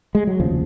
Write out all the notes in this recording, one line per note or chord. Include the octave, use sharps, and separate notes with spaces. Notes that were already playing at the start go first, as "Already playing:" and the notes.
G#3
F#3
F1 D#2 C#3 F3